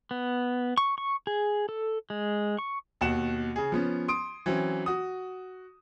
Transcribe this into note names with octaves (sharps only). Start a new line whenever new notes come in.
B3
C#6
C#6
G#4
A4
G#3
C#6
D#2 B2 F#5 E7
C#3 G#4
F3 B3 C#4
C6 D#6 D7
E3 F#3 C4 C#4
F#4 D#6